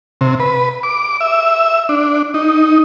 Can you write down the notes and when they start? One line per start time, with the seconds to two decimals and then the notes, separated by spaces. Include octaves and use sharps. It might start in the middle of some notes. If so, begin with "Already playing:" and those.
0.21 C3
0.40 B4
0.83 D6
1.21 E5
1.89 D4
2.34 D#4